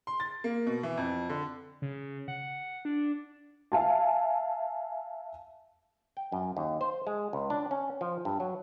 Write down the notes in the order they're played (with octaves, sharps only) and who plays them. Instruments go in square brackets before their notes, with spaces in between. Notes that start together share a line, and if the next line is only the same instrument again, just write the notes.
[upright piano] C6
A6
A#3
B2
E3
F2
D3
[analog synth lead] C#3
F#5
D4
[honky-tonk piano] E5 F5 G#5 A5
[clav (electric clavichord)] G5
F#2
D#2
C5
G#3
C#2
D4
C#4
F3
G2
F#3